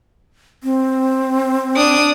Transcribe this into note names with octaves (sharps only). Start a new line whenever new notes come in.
C4
D4 D#6